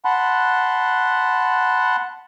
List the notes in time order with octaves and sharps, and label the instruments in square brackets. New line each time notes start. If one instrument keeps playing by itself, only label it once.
[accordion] F#5 A5 B5 C6 F#6